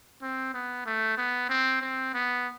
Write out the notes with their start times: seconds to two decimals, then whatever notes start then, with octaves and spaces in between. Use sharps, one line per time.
0.22 C4
0.54 B3
0.86 A3
1.18 B3
1.49 C4
1.81 C4
2.14 B3